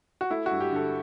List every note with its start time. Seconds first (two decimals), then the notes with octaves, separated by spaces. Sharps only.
0.21 F#4
0.30 A3 E4
0.46 G2 F#4
0.60 G4
0.71 D3 A4